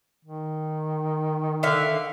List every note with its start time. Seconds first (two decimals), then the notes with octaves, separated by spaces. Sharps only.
0.25 D#3
1.63 D3 E5 F5